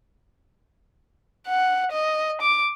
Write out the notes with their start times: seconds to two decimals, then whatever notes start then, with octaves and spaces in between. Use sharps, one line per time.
1.47 F#5
1.92 D#5
2.42 D6